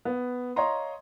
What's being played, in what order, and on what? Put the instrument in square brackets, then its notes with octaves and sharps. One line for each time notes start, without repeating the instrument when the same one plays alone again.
[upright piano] B3
C#5 D#5 F5 A#5 C6